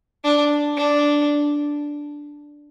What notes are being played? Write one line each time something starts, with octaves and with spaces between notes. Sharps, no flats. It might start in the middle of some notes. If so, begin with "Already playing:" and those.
D4
D4